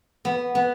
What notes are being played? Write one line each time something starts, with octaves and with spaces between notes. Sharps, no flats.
B3
B3